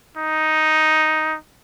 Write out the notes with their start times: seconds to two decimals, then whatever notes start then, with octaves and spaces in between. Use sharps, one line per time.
0.17 D#4